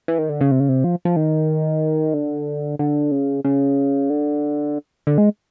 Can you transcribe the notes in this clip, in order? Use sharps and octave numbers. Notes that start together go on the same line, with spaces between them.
E3
D#3
D3
C#3
C3
C#3
C3
F3
F3
D#3
D3
D3
C#3
C#3
D3
D3
G#3